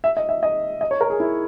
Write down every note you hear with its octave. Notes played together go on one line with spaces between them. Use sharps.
E5
D#5
E5
D#5
D#5
C#5
A#4
G#4
E4